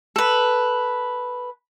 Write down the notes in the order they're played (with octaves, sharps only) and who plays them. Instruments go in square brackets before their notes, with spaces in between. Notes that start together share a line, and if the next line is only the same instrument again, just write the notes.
[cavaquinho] A4 B4